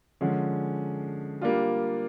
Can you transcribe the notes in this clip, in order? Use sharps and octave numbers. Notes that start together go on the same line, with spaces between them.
D3 F3 G#3 C#4
G3 A#3 D4 F4